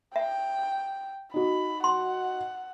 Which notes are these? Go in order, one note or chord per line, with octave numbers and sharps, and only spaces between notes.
E5 G5
D#4 F#4 B5
F#5 C6